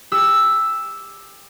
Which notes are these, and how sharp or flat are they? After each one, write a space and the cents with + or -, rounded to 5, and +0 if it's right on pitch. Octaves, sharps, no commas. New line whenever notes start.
G4 +30 E6 +0